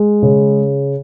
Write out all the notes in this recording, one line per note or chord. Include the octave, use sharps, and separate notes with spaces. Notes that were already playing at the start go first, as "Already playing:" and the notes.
Already playing: G#3
C#3